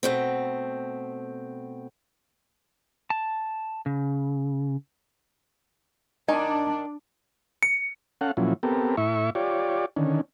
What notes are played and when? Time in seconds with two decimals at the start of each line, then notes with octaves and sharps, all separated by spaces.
0.03 B2 A3 C4
3.10 A5
3.86 C#3
6.28 D#3 D4 D#4 G#5
7.63 C#7
8.21 C#4 A4 F5 F#5
8.37 A#2 F3 F#3 C#4 E4
8.63 B3 C4 G4 A4 A#4
8.97 A2 E4 E5 C#6
9.35 F4 G4 C#5 D5
9.97 D3 D#3 C#4